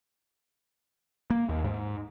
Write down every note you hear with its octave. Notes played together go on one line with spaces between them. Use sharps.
A#3
D#2
G#2